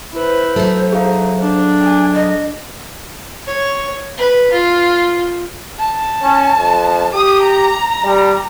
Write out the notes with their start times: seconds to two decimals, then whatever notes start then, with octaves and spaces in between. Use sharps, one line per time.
0.12 E4 B4 C5
0.56 F#3 A3
0.92 D#4 G#4 F5
1.40 D4
1.81 G#5
2.13 D#5
3.47 C#5
4.18 B4
4.53 F4
5.79 A5
6.22 C#4
6.58 F2
7.13 G4 D#6
7.43 A#5
8.05 G3